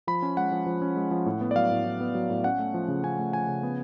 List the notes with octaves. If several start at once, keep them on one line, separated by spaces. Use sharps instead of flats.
F3 B5
C#4
G#3 F#5
F3
F3
C#4
G#3
F3
A2
B3
D5
F#3 F5
A2
A2
B3
F#3
A2
C#4 F#5
A3
F3
C#3
C#4 G#5
A3
F3 G#5
C#3
B3